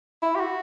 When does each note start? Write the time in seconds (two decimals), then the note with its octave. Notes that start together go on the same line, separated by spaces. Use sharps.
0.22 E4
0.36 G4
0.41 F#4